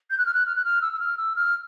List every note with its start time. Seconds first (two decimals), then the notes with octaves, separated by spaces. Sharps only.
0.10 G6
0.18 F#6
0.26 F6
0.34 F#6
0.46 F6
0.56 F#6
0.65 F6
0.82 E6
0.93 E6
1.00 F6
1.17 E6
1.36 F6